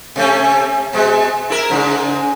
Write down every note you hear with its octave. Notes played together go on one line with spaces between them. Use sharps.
C3 A3 C#4
B2 G#3
E4 A#4
G#2 C#3